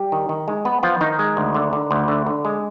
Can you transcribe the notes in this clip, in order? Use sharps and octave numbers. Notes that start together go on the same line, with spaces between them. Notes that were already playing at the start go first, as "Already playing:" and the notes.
Already playing: G3 G4
D#3
D#3
G#3
B3 B4
F3 B3 F4
D#3 D#4
G#3
D2
D3
D3
D2
D3
D3
G#3